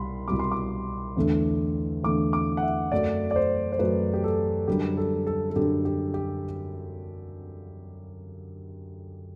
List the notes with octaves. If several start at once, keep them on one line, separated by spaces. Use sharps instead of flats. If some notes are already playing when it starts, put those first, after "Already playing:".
Already playing: C2 B2 G3 B5 C6
C2 B2 G3 D6
C6
D6
E2 D3 A3
E2 D3 A3 D6
D6
F#5
E5
F#2 F#3 A3 D5
D5
C5
C5
F#2 F#3 A3 B4
G4
A4
F#2 D3 G3 G4
A4
A4
A4
F#2 D3 G3 G4
G4
G4